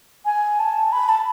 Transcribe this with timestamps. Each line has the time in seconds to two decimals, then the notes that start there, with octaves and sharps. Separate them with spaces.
0.25 G#5
0.59 A5
0.92 B5
1.09 A5